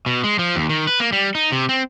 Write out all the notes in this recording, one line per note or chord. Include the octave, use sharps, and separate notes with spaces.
B2
G#3
F3
D#2
D#3
B4
A#3
G3
D#4
C3
C4